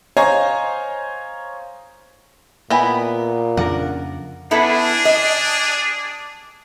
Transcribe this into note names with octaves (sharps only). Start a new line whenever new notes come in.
C5 C#5 D#5 F5 G#5 A#5
A#2 B3 E4 D#5 G5 G#5 B5
F2 C#3 D4 F4 A#4 F#5
B3 D4 E4 G#4 A4
D#5